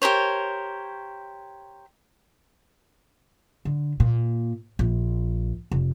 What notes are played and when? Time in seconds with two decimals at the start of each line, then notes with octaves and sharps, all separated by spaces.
0.02 G4 A#4 C5 C#5
3.65 D3
4.00 A#2
4.79 A#1
5.72 F1